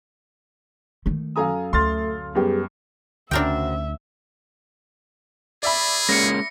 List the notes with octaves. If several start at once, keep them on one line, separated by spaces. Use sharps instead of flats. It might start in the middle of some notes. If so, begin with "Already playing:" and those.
D#3 A3
F#2 A4 F5 G#5 A#5 D#6
D2 A3 C6 F6 A6
F#2 G3 B3 G4 G#4
D2 C#3 D4 F#4 A#4 C5 E5 G5
G#4 D5 E5 B5
G#3 A#3 C#4 A#6 C#7